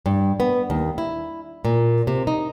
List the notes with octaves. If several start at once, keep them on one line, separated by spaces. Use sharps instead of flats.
G2
B3
D#2
E4
A#2
C3
D#4